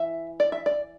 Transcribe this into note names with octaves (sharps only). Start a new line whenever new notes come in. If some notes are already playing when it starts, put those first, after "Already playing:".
Already playing: E3 E5
D5
E5
D5